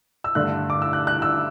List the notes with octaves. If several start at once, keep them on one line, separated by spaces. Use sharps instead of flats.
E6
G2 D3 A3 D4 F#6
D6
E6
F#6
F#6
E6